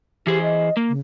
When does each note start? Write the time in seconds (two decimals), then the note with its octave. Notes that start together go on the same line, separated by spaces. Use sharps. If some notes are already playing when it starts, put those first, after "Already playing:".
0.27 E3 G4 G#4 C5
0.43 D#5
0.77 A#3
0.89 C#3